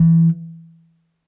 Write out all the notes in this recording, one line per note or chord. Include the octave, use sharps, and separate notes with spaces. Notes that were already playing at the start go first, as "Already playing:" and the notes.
Already playing: E3